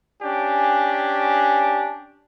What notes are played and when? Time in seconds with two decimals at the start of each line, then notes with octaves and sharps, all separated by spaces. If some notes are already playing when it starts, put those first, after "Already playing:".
0.22 C#4 D4 G4 G#5